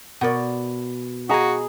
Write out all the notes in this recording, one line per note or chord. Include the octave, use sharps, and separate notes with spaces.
B2 A#4 D5 F#5
F#4 G#4 D#5 G#5 A#5 B5